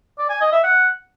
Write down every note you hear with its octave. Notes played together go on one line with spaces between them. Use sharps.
D5
G#5
D#5
E5
F#5